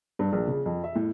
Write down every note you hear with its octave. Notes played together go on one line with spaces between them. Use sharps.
G2
A#1
C#3
F2
E5
A2